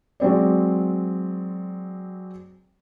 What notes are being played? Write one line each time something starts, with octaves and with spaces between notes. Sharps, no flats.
F#3 G#3 C4 D5